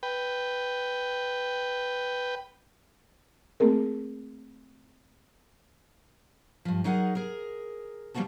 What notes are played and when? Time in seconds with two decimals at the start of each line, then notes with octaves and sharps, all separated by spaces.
0.03 B4 G5
3.60 A3 A#3 C4 G#4 A#4
6.65 G2 F3
6.84 F#3 D#4 G#4 A#4 F#5
7.15 G#4 A#4
8.14 E3 G3 A#3 B3 F#4 A5